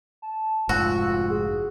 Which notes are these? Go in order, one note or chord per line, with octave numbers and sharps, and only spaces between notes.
A5
F1 G#2 F4 F#4 E6
G#4